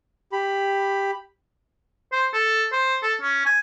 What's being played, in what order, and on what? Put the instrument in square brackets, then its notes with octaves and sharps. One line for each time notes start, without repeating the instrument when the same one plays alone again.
[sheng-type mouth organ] G4 B5
[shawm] C5
A4
C5
A4
C#4
G#5